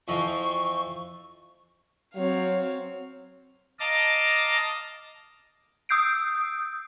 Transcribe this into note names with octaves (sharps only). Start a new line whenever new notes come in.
F2 E3 F3 C#6
F#3 C4 C#5 F5
D#5 F5 A5 A#5 D6
D#6 E6 G6 C7 D7